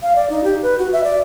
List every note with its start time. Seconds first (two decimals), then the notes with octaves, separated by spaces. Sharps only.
0.03 F5
0.16 D5
0.30 D#4
0.44 G4
0.62 B4
0.79 F#4
0.93 E5
1.04 D5